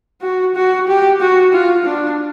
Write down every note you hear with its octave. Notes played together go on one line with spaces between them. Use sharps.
F#4
F#4
G4
F#4
F4
D4